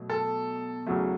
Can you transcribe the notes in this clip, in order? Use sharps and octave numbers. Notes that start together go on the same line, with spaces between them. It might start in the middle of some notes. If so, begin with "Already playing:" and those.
Already playing: B2 F#3 A3
A4
E2 C#3 F#3 A3